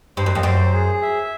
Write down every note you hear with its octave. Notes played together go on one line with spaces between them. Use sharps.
G2 C5
F#2
F2
F#2 C5
G#4
E5